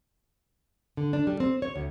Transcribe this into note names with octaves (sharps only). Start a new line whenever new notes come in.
D3
D4
G3
C4
C#5
D2